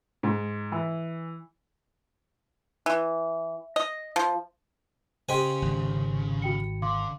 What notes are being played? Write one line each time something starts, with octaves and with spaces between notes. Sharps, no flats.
G#2
E3
E3
D#5
F3
C#3 G4 C5 D#5 G#5 C6
G#1
F#4 G5 C#7
D3 F5 C6 D6